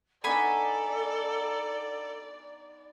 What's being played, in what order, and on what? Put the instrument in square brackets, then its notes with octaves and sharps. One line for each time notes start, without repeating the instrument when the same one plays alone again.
[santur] B3 D4 D#4 [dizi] A4 [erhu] D5 [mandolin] G#5 B5 C#6